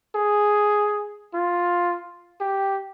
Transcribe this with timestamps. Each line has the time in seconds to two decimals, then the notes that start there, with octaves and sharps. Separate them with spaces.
0.15 G#4
1.34 F4
2.40 G4